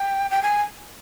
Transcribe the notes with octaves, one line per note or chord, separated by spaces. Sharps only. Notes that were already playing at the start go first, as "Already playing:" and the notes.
Already playing: G5
G5
G#5